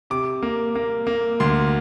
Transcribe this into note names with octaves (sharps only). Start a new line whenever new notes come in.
C3 D6
A#3
A#3
A#3
D2 C6